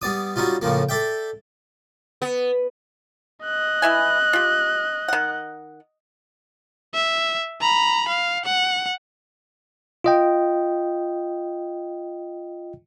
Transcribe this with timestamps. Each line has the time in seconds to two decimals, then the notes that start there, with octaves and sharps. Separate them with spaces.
0.02 G3 B3 D5 D#6
0.36 F#3 G3 C#4 D#4 F4
0.62 A2 C#3 F3 A#3
0.89 A4 D5 E5 G5
2.22 B3
3.45 D#5 F#6
3.82 E3 E4 G#5
4.33 F4 G4
5.08 D#3 F#5
6.94 E5
7.61 A#5 B5
8.08 F5
8.45 F#5
10.04 F4 D#5 G5